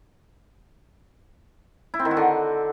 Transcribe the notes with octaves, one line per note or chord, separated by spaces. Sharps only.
E4
C4
D#3
F#4
D3